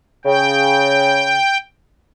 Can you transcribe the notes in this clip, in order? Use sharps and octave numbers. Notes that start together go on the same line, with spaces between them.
C#3 G5